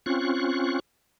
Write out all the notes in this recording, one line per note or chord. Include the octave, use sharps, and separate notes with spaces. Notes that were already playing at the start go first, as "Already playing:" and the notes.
C4 C#4 F4 C#6 F#6